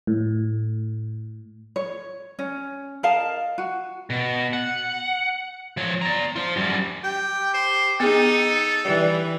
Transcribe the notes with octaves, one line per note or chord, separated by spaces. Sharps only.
A2
C#5
C#4
A#4 D#5 F5 A5
F#4
B2
F#5
F3 C#5
D5 A#5
F4 C5
F#2 G3
G4 G5
C5
B3 D#4 G#4 A4
E3 G3